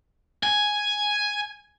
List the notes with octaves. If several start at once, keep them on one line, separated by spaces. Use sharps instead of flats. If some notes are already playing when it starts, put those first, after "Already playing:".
G#5